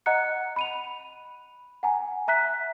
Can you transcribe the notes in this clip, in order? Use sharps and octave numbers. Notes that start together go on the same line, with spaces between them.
D#5 F#5 A#5 F#6 C#7
B5 D#7 F7
F#5 G#5 A#5
E5 A#5 F#6 B6